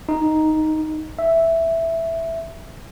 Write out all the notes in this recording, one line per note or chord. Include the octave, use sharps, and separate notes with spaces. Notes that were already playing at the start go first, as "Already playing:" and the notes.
D#4
E5